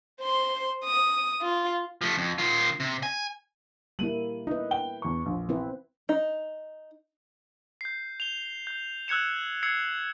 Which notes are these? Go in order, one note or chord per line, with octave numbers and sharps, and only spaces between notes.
C5 C6
D#6
F4
F3 A3
F2
D#3 F4
C3
G#5
G3 A#3 E4 D#7 F#7
D#4 E4 B4
G5 G7
E2 C#6
A#1
C4 E4 B4
D#4
G6 C7
F7 G7
G6
E6 F#6 G#6 C#7 E7
E6 G#6 C7 C#7